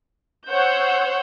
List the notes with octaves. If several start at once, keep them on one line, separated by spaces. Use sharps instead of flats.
C5 C#5 F#5 C6 E6 G6